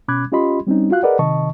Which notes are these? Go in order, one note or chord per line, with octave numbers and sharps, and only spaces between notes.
B2 C#4 B5 D6 F#6 G#6
C#4 F4 G4 D#5 B5 C6
G3 C4 C#4 D#4
F4 F#4 F5 F#6
G#4 A#4 B4 D5 D#5 F#5
C3 D#3 D#5 A5 C#6